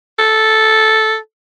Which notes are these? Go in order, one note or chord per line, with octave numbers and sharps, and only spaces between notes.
A4